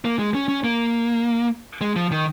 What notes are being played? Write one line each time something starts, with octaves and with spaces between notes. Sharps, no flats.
A#3
G#3
C#4
C#4
A#3
G#3
F3
D#3